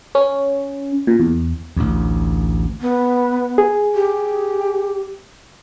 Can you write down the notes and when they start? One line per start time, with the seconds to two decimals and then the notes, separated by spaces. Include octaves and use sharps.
0.15 C#4
1.07 A#2
1.20 E2
1.76 A1 D2
2.81 B3
3.58 G#4
3.95 G4